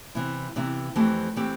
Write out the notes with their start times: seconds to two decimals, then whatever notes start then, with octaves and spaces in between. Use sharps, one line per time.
0.15 C3 E3 B3 E4
0.56 C3 E3 B3 E4
0.96 F2 E3 A3 C4 G4
1.36 E3 A3 C4 G4